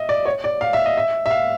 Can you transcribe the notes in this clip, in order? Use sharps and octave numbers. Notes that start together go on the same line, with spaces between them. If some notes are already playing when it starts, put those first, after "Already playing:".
Already playing: D#5 E5
D5
C#5
D5
F5
E5
D#5
E5
E5
F5